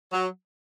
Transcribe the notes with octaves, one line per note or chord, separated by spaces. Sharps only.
F#3